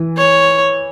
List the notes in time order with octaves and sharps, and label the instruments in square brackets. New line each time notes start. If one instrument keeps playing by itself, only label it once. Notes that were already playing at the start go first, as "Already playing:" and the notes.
Already playing: [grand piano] E3
[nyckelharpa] C#5